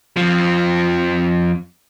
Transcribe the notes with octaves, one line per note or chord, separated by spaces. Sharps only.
F2 F3